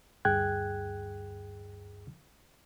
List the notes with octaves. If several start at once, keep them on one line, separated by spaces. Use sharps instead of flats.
D2 G2 G#4 G5 F#6 G#6